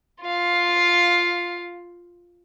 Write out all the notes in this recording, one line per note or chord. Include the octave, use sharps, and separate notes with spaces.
F4 F5